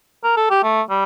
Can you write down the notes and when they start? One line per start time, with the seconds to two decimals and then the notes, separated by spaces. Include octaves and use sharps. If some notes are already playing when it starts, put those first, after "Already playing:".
0.24 A#4
0.37 A4
0.50 G4
0.63 A3
0.90 G3